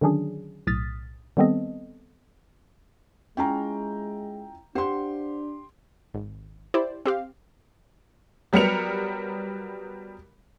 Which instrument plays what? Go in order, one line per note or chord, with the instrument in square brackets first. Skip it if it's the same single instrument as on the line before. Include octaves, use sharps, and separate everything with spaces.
[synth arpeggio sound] D3 D#3 F#3 C#4 D4 G#4
B1 A2 D#6 F6 A6 B6
D#3 G3 B3 C4 A4 D#5
[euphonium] G#3 [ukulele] C#4 E4 F4 [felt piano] G5 A#5
[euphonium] D4 [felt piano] G4 C6 [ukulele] C5 F5 F#5
[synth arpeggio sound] G#1
E4 G4 C5 D5
C4 G4 F5
[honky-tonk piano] F#3 G3 B3 A#4 C#7 F7